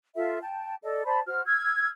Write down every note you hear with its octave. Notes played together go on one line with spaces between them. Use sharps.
F4 A4 E5
G5 A5
A4 D5 D#5
C5 D5 A5 B5
F#4 C5 F6
E6 F6 G#6